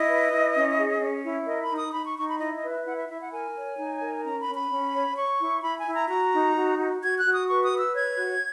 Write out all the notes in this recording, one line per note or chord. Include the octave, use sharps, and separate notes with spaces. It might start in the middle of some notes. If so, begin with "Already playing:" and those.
Already playing: E4 D#5
B4
E4
C#4
G#4
C#4
E4
A#4 D#5
B5
D#4
D#6
D#4 B5
C#6
D#4 C#6
B5
E4 D#5
D#5
B4
E5
E4 F#5
E5
E4 E5
F#5
A#4 G#5
C#5
D#4
A#4
C#4 A#5
B5
C#4
B5
C#4
C#5
C#5 C#6
E4
E4 B5
G#5
E4
A#5
F#4 A#5
D#4
F#4
F#4
F#4 G#6
F#6
F#4
D#6
B4 C#6
D#6
B4
E6
C#5 G#6
F#4